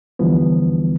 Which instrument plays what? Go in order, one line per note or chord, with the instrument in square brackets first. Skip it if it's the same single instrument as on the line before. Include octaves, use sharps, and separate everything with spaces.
[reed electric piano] D#2 D3 E3 F3 G3 B3